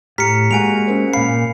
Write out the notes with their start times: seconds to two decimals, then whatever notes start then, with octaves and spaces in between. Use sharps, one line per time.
0.18 A2 G4 A#5 F6 B6 C#7
0.51 G#3 A#3 F#4 G#5 D7 F7
0.87 C#4 A#4 C5
1.13 A#2 F5 B5 C7